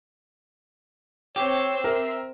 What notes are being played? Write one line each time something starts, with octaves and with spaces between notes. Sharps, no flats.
C4 G4 C#5 E6 C7
A#4 E5